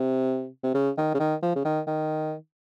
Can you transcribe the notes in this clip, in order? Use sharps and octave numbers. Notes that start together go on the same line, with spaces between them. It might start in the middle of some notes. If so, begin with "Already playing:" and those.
Already playing: C3
C3
C#3
D#3
C#3
D#3
F3
C#3
D#3
D#3